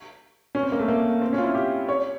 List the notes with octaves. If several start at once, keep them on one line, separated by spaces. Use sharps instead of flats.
C#4
C4
A#3
A3
A#3
C4
C#4
F4
E4
G4
C#5